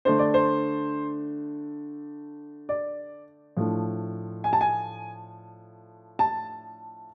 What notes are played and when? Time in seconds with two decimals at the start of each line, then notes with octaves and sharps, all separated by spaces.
0.05 D3 A3 D4 C5
0.19 D5
0.34 C5
2.69 D5
3.57 A2 F3 A3 D4
4.44 G#5
4.53 A5
4.61 G#5
6.19 A5